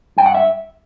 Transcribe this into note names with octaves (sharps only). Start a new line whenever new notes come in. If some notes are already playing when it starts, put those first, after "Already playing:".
G2 G5
F#5
E5